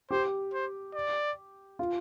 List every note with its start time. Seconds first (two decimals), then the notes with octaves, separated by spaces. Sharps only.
0.11 G4 C5
0.53 C5
0.95 D5
1.79 F4